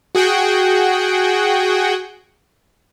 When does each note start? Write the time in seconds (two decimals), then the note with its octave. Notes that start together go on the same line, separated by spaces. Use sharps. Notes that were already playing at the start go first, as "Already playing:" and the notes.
0.15 F#4 G#4 F#5 G5